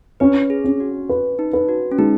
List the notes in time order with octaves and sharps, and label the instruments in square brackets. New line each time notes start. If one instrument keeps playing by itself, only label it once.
[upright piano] C#4 [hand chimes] B4
[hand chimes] G#4
[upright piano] C#4
[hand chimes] F#4
[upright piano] B4
[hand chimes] D#4
[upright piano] B4
[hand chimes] F#4
C#4
[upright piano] G#3 [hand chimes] D#4